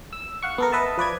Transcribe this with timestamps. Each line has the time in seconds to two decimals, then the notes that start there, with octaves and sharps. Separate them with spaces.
0.13 E6
0.43 F5 F#5 C#6
0.58 B3 A4 A#4
0.72 B4 D#5 E5 A5
0.97 F3 B4 D5 G#6